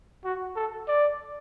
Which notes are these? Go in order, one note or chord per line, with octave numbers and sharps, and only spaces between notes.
F#4
A4
D5